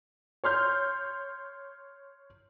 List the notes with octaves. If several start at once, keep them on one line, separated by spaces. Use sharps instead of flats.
C#5 C6 F6 G6